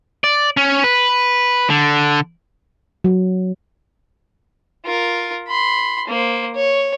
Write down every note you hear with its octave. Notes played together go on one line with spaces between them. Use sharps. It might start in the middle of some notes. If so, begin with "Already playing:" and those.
D5
C#4
B4
D3
F#3
F4 A#4
B5 C6
A#3 C5
C#5